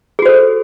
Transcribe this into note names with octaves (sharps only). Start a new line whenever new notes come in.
F#4 G#4 A4 C5